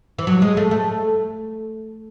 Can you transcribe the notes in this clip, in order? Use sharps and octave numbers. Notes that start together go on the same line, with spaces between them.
E3
F#3
G#3
A3
A3